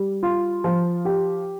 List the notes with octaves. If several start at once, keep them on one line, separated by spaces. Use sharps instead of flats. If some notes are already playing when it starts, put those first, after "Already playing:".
Already playing: G3
F4
F3
G4